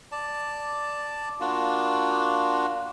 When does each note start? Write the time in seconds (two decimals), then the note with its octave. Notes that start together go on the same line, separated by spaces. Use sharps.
0.12 D5 A5
1.40 A#3 D4 F4 F#4